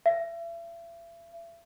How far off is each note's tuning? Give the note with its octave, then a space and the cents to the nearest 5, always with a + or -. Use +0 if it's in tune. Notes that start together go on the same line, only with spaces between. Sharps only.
E5 +40